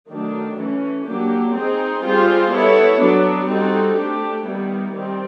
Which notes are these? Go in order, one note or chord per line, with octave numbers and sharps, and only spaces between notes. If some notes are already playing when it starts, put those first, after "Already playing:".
D#3 F#3 A3 D4
E3 A3 C#4
F#3 A#3 D4 G4
C4 D#4 G#4 C5
G3 C4 F4 G#4 C5
B3 E4 A4 C#5
F#3 B3 D4
G3 C4 D#4 F#4 A4
A3 D4 G4
D#3 G3 B3 E4
D#3 G3 C4